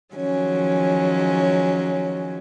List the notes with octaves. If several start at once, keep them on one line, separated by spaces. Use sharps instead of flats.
D#3 F3 F#3 G#3 C#4